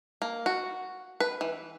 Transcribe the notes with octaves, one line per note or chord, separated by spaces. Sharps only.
A#3
F#4
B4
E3